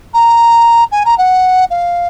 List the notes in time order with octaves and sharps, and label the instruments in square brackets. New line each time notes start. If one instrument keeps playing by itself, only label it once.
[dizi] A#5
G#5
A#5
F#5
F5